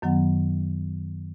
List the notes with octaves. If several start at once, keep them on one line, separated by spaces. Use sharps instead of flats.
F#2 D#3 F#3 B3 F#5